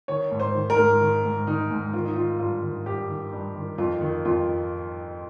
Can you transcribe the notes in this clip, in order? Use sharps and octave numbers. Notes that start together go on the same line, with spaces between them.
D#3 C#5
G#2
C5
D#3
A#4
G#2
D#3
G#2
D#3 D#4
G#2
D#3 F4
D#4
D#3 F4
G2 F4
D#3
G2 G4
D#3
G2
D#3
F2 F4
D#3
F2 F4